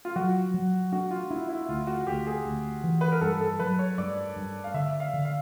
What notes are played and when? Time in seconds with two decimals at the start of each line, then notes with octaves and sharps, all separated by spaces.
0.05 F4
0.16 F#3 F#4
0.54 F#3
0.92 D4 F#4
1.11 F4
1.30 D4 E4
1.49 E4
1.69 D2 F4
1.87 F#4
2.07 D2 G4
2.27 G#4
2.45 D2
2.84 E3
3.01 B4
3.12 A#4
3.21 G2 A4
3.41 A4
3.59 F#3 B4
3.79 C#5
3.98 G2 D5
4.36 G2
4.64 F5
4.74 D3 E5
5.00 F5
5.13 D3
5.25 F5